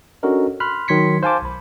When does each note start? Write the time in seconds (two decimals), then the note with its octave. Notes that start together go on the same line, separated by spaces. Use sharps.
0.23 C#4 D4 F#4 A4 A#4 D#5
0.60 B5 C6 F6 F#6
0.88 D#3 F#3 C6 G#6 B6 C#7
1.23 C5 F5 G#5 A5 D6
1.42 B1 B5